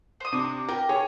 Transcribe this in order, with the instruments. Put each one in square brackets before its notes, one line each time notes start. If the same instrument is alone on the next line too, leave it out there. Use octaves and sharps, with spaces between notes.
[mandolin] C5 D#6
[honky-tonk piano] C3 D4
[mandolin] G4 [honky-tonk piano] A#4
[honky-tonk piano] G#4 C#5